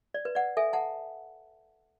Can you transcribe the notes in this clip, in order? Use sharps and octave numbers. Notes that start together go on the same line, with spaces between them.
D5
B4
D5 F#5
A4 E5 G#5
F#5 A5